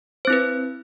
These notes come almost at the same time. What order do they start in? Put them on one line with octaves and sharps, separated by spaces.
C5 C4 E4 B4